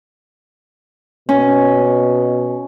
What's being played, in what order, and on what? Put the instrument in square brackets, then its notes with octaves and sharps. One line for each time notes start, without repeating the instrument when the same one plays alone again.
[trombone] B2 [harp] C#4